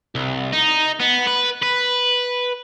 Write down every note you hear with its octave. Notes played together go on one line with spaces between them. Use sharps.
C2
D#4
B3
B4
B4